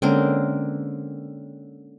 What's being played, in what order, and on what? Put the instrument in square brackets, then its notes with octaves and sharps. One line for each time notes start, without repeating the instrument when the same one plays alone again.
[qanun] D3 C4 A#4 [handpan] G#3 A#3 C#4